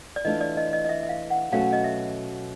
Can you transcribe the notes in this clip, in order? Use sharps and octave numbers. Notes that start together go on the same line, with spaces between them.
D5
E3 A3 D4 F4 D#5
D5
D#5
D#5
D#5
E5
E5
F5
F#5
B2 F#3 A3 C#4 F#4 F5
D#5
E5